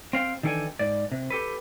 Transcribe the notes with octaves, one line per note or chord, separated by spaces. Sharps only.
C4 F5 G5
D#3 E3 D4 A4 G5 G#5
G#2 D5
C3
G4 A4 B4